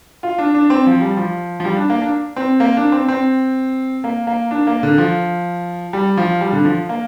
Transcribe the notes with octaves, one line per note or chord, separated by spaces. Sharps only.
F4
D4
D4
C4
F3
G3
F3
F3
G3
D4
A#3
D4
C4
A#3
D4
C4
C4
A#3
A#3
D4
A#3
D3
F3
G3
F3
G3
D3
F3
A#3